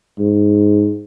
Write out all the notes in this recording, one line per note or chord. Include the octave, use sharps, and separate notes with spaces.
G#2